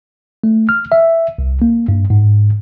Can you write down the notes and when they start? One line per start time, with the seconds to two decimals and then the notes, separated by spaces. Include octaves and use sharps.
0.44 A3
0.69 F6
0.92 E5
1.38 C2
1.62 A#3
1.88 G2
2.10 G#2